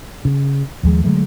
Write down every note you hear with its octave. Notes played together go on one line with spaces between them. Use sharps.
C#3
D#2 F3 G#3
D3 F#3 G#3 A3